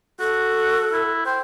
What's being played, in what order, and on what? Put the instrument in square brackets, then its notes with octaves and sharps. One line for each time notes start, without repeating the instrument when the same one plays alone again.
[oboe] F#4 [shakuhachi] A4
[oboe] E4
[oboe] C5 [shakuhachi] G5